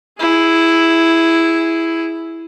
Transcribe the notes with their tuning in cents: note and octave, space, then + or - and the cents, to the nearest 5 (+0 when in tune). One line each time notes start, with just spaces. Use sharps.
E4 +0 G#4 +0